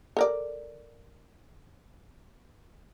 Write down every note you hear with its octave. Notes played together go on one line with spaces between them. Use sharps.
A4 A#4 D5